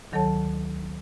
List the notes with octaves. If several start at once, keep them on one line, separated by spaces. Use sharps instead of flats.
D2 D#3 F#3 A4 C#5 A5